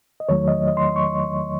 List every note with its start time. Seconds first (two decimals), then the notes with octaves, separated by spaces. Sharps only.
0.20 D#5
0.29 E2 D#3 F#3 A3 C#5
0.48 D#5
0.67 D#5
0.77 C6
0.96 C#6